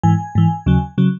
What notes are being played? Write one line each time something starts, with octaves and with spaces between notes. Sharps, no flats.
G#2 E3 G#5
G#2 E3
D#2 C#3 F#3
C#3 F#3